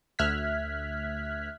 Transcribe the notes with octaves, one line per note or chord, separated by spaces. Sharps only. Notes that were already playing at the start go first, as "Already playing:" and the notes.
D2 E5 F6 F#6 G#6 B6